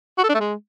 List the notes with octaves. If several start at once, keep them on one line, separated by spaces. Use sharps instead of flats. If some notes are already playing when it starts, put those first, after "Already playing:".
F#4
A4
D4
A3
G#3